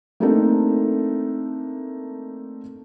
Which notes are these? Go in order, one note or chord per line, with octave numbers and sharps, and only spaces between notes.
A3 A#3 C4 D4 D#4 A4